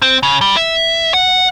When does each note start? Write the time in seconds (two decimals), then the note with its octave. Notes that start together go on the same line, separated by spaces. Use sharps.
0.02 C4
0.23 C#3
0.41 G3
0.57 E5
1.14 F#5